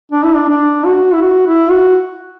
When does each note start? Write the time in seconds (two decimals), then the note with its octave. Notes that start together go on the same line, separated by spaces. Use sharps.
0.12 D4
0.24 E4
0.35 D4
0.49 D4
0.85 F#4
1.13 E4
1.22 F#4
1.47 E4
1.71 F#4